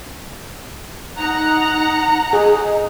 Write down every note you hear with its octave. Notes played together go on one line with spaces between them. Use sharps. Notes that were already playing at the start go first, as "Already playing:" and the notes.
D#4 F#5 A#5 F#6
G#4 D#5